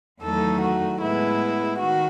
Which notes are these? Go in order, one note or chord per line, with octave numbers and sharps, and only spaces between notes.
E2 D#3 F#3 A3 D#4 A4
F#4
A2 G#3 B3 E4
D#3 F#4